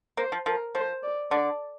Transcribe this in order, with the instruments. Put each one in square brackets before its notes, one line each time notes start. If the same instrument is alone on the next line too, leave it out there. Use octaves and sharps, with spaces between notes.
[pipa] A#3 [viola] C5
[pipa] F3
[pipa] F3 [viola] A#4
[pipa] F3 [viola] C5
[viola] D5
[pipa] D3 [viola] D5